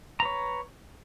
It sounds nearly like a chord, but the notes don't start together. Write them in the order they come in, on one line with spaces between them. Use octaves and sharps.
A#5 B4 C#5